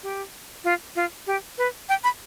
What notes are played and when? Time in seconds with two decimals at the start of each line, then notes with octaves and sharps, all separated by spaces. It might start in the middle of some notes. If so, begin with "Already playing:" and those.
0.03 G4
0.64 F4
0.96 F4
1.27 G4
1.58 B4
1.89 G5
2.04 B5